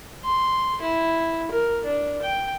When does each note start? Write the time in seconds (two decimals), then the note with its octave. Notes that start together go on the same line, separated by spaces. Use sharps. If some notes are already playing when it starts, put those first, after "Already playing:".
0.25 C6
0.81 E4
1.52 A#4
1.85 D4
2.22 G5